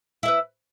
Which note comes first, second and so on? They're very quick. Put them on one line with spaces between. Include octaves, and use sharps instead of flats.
E4 E5 B4